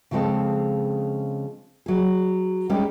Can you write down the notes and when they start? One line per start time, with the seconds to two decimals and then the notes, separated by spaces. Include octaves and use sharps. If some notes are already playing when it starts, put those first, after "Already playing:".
0.11 C#3 F3 G#3 C4 A4
1.86 F#3 G#4
2.69 G3 G#3 C#4 D#4 G4